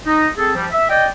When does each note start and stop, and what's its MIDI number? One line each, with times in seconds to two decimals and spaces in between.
0.06 0.27 63
0.37 0.53 60
0.37 0.53 68
0.37 0.53 69
0.55 0.66 53
0.55 0.66 55
0.71 0.85 76
0.89 1.06 74
0.89 1.06 75
0.89 1.06 79